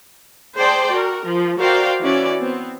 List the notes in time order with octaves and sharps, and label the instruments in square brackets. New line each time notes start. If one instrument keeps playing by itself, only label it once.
[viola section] G#4 C5 D5 G5 A5 C6
F#4 A#4
F3
F#4 A#4 C5 D5 F5 G5
E3 C#4 E4 F#4 D5
B3 C4